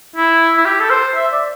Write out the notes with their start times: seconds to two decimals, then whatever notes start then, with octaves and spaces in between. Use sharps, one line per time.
0.16 E4
0.57 E4
0.65 G4
0.80 A4
0.90 C5
1.15 E5
1.32 D5